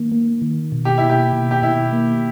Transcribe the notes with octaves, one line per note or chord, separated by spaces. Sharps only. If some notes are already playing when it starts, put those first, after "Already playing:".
Already playing: D#3 A#3
A#3
D#3
B2
G4
B2 E4
G4
B2
G4
B2 E4
A#3